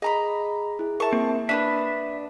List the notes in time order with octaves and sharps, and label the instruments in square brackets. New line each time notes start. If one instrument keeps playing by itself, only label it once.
[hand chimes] G#4 [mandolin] D#5 A#5 B5
[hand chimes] E4 G#4
[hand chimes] A#4 E5 [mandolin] A5 C#6
[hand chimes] A#3 [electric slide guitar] C4
[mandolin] B3 C#4 D4 [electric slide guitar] B4 E5